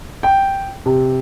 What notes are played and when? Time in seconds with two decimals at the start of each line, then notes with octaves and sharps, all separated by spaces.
0.23 G5
0.86 C3